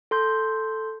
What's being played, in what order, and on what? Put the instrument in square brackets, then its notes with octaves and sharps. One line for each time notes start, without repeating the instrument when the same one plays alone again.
[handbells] A4 C6 G6